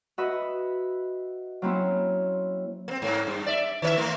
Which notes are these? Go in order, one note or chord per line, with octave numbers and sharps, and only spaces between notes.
F#4 B4 D#5 E5 B5
F#3 A#3 C4 C#4 E4
A#3 C4
G#2 A#3
G2
D5 E5
D#3 C#5 E5
A3 A#3